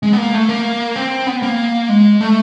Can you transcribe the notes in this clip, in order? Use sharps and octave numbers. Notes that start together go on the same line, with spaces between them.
G#3
B3
A#3
A3
A#3
C4
B3
A#3
G#3
A3